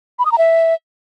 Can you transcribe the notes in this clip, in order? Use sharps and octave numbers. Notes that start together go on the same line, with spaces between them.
B5
D#6
A#5
E5